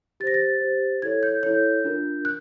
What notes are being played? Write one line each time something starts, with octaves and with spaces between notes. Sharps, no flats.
G4 C5 A6 A#6
A6
G4 C5
E4 A4 C#5 G#6
G6
E4 A4 C#5 G6
D4 F4 A#4
F#6